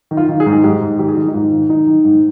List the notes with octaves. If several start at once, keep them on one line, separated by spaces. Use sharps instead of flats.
D#3
F4
D#3
G#4
G#2
G#4
G#2 G4
G#2
D#3 G4
G#4
D#3 G4
D#4
G#2 F4
D#3
D#3 D#4
D#3
G#2